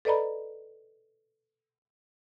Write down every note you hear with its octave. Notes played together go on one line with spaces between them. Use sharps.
A4 B4 D5 D#5 A#5 B5